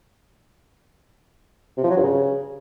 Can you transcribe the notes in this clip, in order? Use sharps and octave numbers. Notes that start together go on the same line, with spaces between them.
C3
F3
F#3
G2
C#3